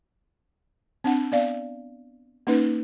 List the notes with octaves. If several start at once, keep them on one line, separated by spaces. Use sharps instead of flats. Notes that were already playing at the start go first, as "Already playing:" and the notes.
C4 D4 F#5
B3 D5 F5
A#3 C#4 D#4 B4